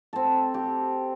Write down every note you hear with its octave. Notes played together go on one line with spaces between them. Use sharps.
C4 A4
G4